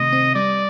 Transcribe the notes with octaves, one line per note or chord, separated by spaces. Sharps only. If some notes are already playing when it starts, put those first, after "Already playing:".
Already playing: C3 D#3 A3 D#5
C4
G3 D5